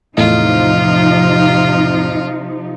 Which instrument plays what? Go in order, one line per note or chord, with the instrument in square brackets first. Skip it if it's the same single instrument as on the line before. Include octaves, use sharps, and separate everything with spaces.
[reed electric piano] E2 A2 D#5 [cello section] C3 F3 D#4 [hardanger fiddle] F4